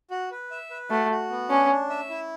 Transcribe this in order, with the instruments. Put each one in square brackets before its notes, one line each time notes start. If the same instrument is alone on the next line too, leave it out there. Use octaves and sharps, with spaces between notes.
[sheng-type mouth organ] F#4
B4
E5
B4
[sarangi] A3 [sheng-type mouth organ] F#4
[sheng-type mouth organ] F#4
B3
[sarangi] C#4 [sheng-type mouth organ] D4
[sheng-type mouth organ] D4
E5
E4